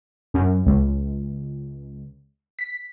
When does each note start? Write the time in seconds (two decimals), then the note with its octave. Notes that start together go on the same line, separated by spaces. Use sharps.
0.34 F#2
0.66 C#2
2.59 B6